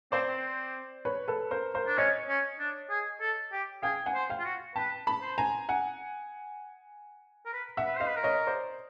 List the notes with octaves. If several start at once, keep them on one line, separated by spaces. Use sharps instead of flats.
C4 C5 D5
C4
B4 C#5
A4 B4
A#4 C5
A#4 C5
D4
C#4 C#5 D#5
C#4
D4
G#4
A4
G4
G#4 F5 G5
F#5 G#5
C5
F5 G5
F4
F#4
B4 G5 A5
A5 B5
C5
G#5 A#5
F#5 G#5
A#4
B4
E5 F#5
B4
C5 D#5 F5
B4
A#4
C#5 D#5
C5 D5